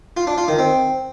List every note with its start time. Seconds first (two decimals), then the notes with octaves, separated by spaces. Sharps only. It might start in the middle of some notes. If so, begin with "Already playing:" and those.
0.17 F4
0.27 D4
0.38 F4
0.48 D#3
0.59 C4